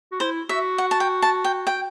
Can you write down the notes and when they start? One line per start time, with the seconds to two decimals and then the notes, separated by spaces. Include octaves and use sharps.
0.12 F#4
0.20 E4 C5
0.49 F#4 E5
0.78 F#5
0.91 A5
1.00 G5
1.22 A5
1.44 G5
1.67 G5